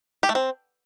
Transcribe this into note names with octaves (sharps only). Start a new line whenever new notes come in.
G4
A3
C4